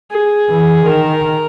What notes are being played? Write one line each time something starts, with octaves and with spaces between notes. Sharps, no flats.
G#4
E3
D#3 A#4